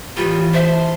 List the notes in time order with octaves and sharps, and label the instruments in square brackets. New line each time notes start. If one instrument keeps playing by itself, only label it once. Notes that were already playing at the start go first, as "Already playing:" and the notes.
[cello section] A2 E3 [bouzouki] G3 A#3 B3 [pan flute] F4
[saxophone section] C5 [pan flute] E5 [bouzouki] A5